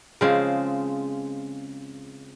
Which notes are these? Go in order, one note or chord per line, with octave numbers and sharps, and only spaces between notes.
C#3 F3 G#3 C4